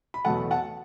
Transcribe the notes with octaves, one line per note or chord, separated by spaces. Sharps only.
B5
E2 B2 F#3 A3 F#5 A5
F#5 A5